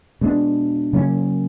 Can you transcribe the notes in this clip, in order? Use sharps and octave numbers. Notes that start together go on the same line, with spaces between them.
B2 G#3 B3 D4
C#3 F#3 A#3 C#4